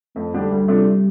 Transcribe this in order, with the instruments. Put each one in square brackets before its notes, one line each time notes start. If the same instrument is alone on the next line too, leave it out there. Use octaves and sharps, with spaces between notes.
[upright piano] F2 [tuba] A3
[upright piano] D3 G3 D4 G4
[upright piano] D2 [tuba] G3
[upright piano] C3 A3 D4 F4